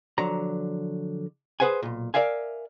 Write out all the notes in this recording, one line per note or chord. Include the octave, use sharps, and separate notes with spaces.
D3 F3 F#3 A#5
G#4 B4 C5 F#5 G#5
B1 A#2
A#4 D5 E5 F5 G#5